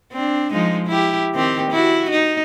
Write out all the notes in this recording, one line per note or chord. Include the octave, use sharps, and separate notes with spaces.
C4 D4
F3 G#3 D#4
E4 G4
D#3 C4 G4
E4 F#4
D#4